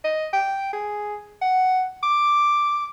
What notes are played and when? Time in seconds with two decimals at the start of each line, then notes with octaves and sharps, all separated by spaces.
0.04 D#5
0.33 G5
0.73 G#4
1.42 F#5
2.03 D6